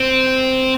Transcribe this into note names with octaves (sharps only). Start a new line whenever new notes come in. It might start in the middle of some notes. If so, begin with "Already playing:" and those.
Already playing: C4